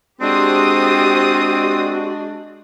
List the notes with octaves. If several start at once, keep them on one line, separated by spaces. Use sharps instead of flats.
G#3 C4 D4 F#4 G4 C5 D#6